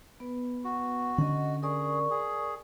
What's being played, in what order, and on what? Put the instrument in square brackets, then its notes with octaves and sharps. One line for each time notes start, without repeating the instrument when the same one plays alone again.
[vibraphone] B3 B4
[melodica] F#4
[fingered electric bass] D3 C#4 [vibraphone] D#5 F#5
[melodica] G#4 [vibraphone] A#4 D5 C#6
[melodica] G#4